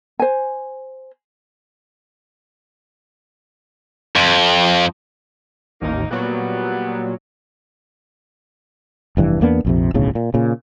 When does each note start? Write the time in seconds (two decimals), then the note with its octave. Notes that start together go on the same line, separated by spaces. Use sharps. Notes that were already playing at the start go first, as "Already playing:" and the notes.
0.20 C5 G#5
4.16 F2
5.82 A1 D#2 A#3 D#4
6.11 A#2 F#3 G3 B3
9.17 F1 G2 E3
9.41 E2 A#3 B3 D4
9.65 A#1 F2 C3
9.94 D1 B1 A2 C#3
10.15 A#2
10.34 A#2 C#3